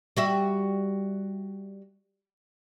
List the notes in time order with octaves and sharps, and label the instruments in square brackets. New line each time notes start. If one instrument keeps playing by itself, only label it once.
[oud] G3 F#4 E5